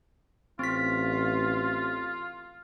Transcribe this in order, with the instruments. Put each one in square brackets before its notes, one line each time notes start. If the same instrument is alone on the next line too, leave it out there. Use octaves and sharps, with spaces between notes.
[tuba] A1 [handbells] C4 B6 [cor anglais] F4